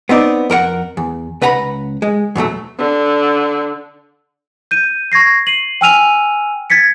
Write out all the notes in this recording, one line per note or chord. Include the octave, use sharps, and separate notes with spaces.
B3 C4 D#4 D5
F2 A#4 C5 F#5
E2
C#2 B4 F#5 A#5 B5
G#3
E2 B2 F#3 A3
D3
G6 D#7
C#6 G#6 A#6 C7
C7 D#7 F#7
G5 G#5 E6 F6 D#7 F7
G#6 A6 B6 C#7